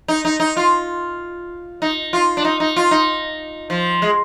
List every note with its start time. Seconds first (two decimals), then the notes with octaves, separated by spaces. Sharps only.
0.08 D#4
0.25 D#4
0.40 D#4
0.57 F4
1.82 D#4
2.13 F4
2.37 D4
2.45 D#4
2.60 D#4
2.76 F4
2.91 D#4
3.70 F3
4.02 G#3